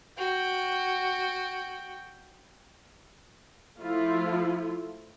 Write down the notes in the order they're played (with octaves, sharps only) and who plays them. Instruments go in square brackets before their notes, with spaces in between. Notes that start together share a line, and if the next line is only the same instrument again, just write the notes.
[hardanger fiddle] F#4 G5
[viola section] F3 A3 E4 F4